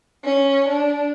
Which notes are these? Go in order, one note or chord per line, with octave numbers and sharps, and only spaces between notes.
C#4
D4